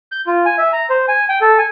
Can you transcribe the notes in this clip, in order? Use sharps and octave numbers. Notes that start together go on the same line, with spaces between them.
G6
F4
G#5
E5
A#5
C5
G#5
G5
A4
G#5